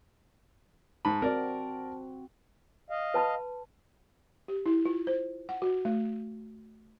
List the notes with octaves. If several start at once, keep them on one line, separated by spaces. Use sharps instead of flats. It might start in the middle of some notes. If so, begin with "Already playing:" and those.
G#2 A5 B5
C4 F#4 A#4 D5
D#5 F5
B4 A5 B5
G4
E4
F4
C5
F#5
F#4
A3